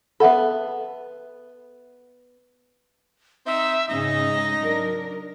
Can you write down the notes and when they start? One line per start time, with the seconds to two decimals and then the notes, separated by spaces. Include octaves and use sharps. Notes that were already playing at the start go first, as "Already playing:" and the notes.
0.20 B3 A4 E5 F#5 B5
3.46 C4 D#4 E5
3.89 G#2 C#3 C#4 D#4 D#5 A#6
4.58 F#3 D4 A#4